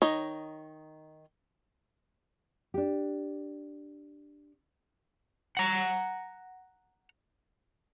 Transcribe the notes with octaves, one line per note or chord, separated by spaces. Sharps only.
D#3 D#4 C#5 D#5
D4 G4
F#5 A#5